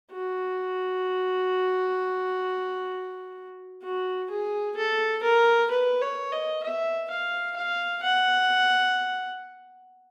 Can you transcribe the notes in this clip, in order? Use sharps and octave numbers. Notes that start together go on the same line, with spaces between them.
F#4
F#4
G#4
A4
A#4
B4
C#5
D#5
E5
F5
F5
F#5